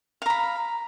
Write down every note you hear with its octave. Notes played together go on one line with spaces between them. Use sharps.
F5 A#5 B5